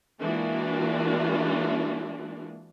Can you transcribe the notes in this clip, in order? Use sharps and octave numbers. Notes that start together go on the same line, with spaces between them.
E3 G#3 A#3 D4 F4 F#4